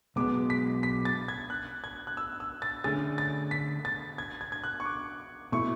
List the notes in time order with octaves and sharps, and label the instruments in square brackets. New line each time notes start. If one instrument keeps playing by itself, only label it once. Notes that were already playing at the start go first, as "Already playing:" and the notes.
[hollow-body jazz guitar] B1 B2 G#3 B3 [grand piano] D6
[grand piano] B6
B6
A6
G#6
F#6
G#6
F#6
E6
E6
A6
[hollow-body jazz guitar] D3 A3 C#4 G#4 [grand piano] A6
[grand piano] A6
B6
A6
G#6
G#6
G#6
F#6
C#6
D6
[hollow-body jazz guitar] B2 A3 E4 [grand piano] C#6